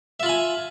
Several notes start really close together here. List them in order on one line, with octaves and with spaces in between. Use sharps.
E5 F4 B5 G#5